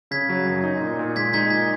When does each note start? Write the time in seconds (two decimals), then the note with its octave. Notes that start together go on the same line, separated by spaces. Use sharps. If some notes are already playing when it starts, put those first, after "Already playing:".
0.11 C#3 G#6 B6
0.29 F#3
0.46 F#2
0.64 D#4
0.81 A#2
0.99 A#2
1.16 G#3 G#6 B6
1.33 D#4 G#6 B6
1.50 A#2 G#6 B6